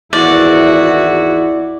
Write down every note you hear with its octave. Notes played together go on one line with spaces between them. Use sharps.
G#1 E2 E4 F#4 D5